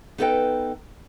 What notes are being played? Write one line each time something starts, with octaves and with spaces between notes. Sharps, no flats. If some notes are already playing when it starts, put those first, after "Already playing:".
B3 D#4 A4 B4 D#5 G5